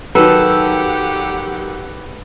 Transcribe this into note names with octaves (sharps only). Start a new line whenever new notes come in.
D#3 F#3 G4 A4 B4 F#5